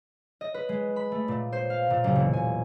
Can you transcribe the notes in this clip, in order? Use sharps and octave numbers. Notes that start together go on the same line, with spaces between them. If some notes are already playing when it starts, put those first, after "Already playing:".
D#5
B4
G#3
B5
A3
A#2
C5
F5
A#2
F#1
E1
G#5